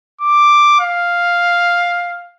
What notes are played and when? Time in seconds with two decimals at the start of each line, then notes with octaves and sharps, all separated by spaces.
0.21 D6
0.80 F5